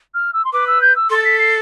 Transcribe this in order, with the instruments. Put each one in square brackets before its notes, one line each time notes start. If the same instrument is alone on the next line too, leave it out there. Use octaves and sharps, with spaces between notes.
[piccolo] F6
E6
C6
[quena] B4 [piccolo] D6
[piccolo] E6
G6
E6
[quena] A4 [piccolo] C6
[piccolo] A6
B6
C7